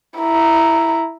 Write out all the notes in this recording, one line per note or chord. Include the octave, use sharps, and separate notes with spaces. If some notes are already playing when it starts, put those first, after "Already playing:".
E4 A#5